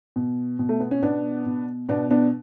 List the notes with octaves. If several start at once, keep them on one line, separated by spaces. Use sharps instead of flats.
B2
B2
A3
B3
C#4
B2 B3 D4
B2
B2 B3 D4
B3 D4